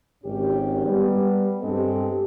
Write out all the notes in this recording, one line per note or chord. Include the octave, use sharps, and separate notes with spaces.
G#1 G#2 C#4 G4
G3 B3
G2 G#3 C4 G4 A4